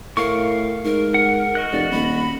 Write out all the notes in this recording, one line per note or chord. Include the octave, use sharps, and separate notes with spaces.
A2 A#4 F5 C#6
G#2 A#4
F#5
F#4 D#5 F#6
F1 D5
D#1 B5